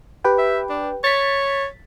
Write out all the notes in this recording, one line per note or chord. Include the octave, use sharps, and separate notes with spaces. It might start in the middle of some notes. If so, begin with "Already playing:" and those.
G4 B4 G5
E5
D4
C#5 A6 B6